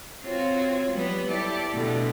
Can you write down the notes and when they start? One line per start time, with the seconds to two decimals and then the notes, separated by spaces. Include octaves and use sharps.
0.22 C4 F4 F#4 C#5
0.91 F#3 G3 B3
1.27 E4 G4 A4 D5
1.74 B2 D3 G3 A3